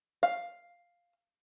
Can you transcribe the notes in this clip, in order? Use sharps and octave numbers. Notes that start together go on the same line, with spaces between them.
F5